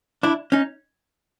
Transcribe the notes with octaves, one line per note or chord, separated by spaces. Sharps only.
D4 E4
C#4 D#4